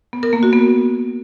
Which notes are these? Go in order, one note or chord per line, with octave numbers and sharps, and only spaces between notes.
B3
A#4
A#3
F#4
B3